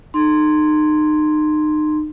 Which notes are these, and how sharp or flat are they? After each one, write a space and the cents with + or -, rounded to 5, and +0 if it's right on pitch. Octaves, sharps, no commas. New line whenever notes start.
D#4 -30 C6 +0